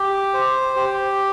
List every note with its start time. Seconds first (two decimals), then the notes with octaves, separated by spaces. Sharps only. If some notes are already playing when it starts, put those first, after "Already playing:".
Already playing: G4
0.34 C5
0.76 G4